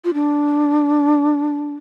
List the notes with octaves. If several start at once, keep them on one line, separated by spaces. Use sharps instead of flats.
F4
D4